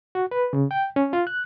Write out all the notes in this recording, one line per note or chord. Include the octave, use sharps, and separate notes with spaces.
F#4
B4
C#3
G5
C#4
F4
F#6